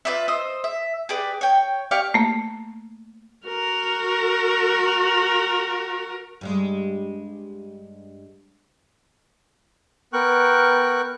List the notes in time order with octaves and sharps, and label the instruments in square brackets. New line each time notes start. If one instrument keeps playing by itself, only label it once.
[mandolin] F4 B4 D5 E5
C5 D#5 E6
E5
G4 G#4 B4 D5
C#5 G5
G4 D5 F5 C#6
[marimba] A3 A#3
[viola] F#4 A#4
[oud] G2 G3 G#3
[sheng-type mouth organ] B3 A#4 G5 C#6 F#6